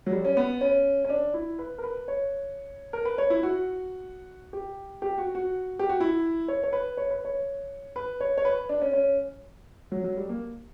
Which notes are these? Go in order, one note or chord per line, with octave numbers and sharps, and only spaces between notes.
F#3
G3
C#4
B3
C#4
C#4
D4
E4
B4
A#4
B4
C#5
A#4
B4
C#5
E4
F#4
G4
G4
F#4
F#4
G4
F#4
E4
C#5
C#5
B4
C#5
B4
C#5
B4
C#5
C#5
B4
D4
C#4
C#4
F#3
F#3
G3
A#3